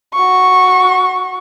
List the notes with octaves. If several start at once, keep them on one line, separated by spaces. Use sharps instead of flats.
F#4 C#6